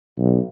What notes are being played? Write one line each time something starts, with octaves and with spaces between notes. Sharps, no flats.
B1